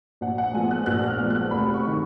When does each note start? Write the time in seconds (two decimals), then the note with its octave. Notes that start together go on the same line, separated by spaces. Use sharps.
0.21 A#1 F#5
0.38 F#5
0.54 G#2 F3 B3 G#5
0.71 F#6
0.86 A#1 F#6
1.08 F6
1.18 G#2 F3 B3
1.30 F#6
1.51 F1 B5
1.74 C#6
1.87 D#3